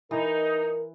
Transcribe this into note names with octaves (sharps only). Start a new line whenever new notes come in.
E3 D#4 A#4